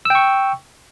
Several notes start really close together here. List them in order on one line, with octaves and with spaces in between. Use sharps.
E6 G5 C#6